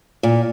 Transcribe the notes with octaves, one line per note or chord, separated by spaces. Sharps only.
A#2